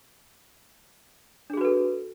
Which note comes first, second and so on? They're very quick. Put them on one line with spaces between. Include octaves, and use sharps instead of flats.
D4 G#4 F#4 B4 A4